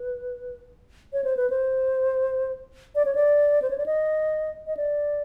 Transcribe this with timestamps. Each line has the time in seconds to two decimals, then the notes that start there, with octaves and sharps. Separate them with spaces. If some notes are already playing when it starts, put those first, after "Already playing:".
Already playing: B4
1.13 C#5
1.24 C5
1.37 B4
1.50 C5
2.95 D5
3.05 C#5
3.15 D5
3.62 C5
3.70 C#5
3.78 D5
3.86 D#5
4.67 D#5
4.77 D5